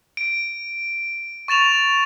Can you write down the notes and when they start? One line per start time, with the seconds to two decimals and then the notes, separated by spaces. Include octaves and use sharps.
0.17 D7
1.48 C#6 A6 E7 F7